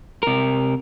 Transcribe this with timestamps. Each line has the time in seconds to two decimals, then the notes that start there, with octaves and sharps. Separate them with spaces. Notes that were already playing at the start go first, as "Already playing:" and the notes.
0.23 C3 A#4